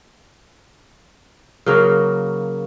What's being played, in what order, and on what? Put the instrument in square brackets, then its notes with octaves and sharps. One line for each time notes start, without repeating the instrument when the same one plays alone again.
[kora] C#3 F#3 A#3